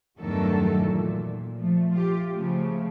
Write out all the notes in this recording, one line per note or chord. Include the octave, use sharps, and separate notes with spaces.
E2 G2 D#3 F#3 A3 A4
A#2
F3 A3
F4 G4
C#3 F3 A3